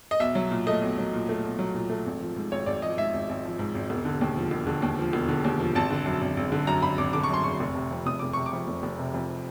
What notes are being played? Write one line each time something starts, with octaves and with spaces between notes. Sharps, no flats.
D#5
B1 E5
F#3
A#2
A3 D#5
B1
F#3
A#2
A3
B1
F#3
A#2
A3
G#1
F3
G#2
G#1 C#5
G#1 D5
F3 D#5
G#2 E5
G#1
G#1
F3
G#2
G#1
E1
D3
D#2
F3
E1
D3
D#2
F3
E1
D3
D#2
F3
G#1 A5
D3
F#2
G#1
G#1
D3
F#2 A#5
G#1 B5
G#1 D6
D3 D6
C#6
F#2 C6
G#1 C#6
F1
C3
F2
F1 D#6
F1 D6
C3 C#6
D6
F2
F1
F1
C3
F2